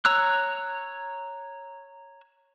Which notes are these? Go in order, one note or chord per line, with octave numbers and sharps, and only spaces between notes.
C#5 A#5 E6 F#6